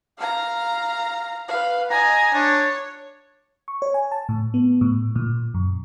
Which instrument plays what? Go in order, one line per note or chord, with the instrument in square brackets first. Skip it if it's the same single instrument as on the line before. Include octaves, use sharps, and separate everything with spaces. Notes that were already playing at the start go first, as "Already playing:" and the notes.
[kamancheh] F5 A#5
B4 F5
[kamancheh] D#5 G#5 [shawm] A#5
[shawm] D4 [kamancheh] C#5
[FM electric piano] C#6
C#5
G#5
A5
A2
B3
A2
A#2
F#2